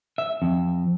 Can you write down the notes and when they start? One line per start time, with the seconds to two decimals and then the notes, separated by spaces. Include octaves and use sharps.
0.18 E5
0.42 F2